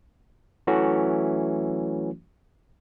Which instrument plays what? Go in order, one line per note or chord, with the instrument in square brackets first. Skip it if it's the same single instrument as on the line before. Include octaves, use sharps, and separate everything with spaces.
[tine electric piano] E3 F#3 A3 C#4 F#4